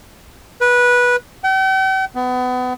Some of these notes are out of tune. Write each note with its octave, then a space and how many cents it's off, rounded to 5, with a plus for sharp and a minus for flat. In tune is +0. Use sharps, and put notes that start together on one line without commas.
B4 -15
G5 -45
B3 +30